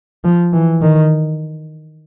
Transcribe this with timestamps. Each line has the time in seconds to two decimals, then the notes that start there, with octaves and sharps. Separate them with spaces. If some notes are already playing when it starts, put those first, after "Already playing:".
0.24 F3
0.53 E3
0.81 D#3